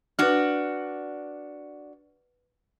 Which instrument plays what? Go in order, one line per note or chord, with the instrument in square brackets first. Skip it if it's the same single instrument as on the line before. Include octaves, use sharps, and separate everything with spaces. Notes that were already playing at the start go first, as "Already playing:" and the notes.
[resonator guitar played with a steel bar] D4 F#4 [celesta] B4 F6